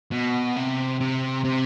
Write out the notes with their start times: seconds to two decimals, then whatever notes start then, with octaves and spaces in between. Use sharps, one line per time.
0.12 B2
0.56 C3
1.00 C3
1.44 C3